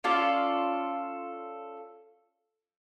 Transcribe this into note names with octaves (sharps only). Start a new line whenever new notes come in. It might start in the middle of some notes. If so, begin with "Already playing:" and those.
C#4 F4 A4 D5